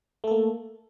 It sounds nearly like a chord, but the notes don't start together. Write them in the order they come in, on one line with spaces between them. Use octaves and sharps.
A3 A4 A#3